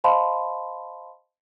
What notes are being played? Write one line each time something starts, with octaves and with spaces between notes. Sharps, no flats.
C5 D#5 F5 A5 B5 C6